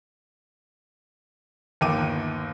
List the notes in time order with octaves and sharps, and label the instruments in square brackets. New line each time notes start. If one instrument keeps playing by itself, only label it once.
[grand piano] G1 D#2 G5 D6 D#7